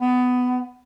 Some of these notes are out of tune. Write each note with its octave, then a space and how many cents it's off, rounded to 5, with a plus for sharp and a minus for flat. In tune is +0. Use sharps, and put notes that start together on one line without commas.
B3 +15